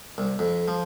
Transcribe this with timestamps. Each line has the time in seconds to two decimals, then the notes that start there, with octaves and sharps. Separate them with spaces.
0.18 C2
0.39 F2
0.68 F3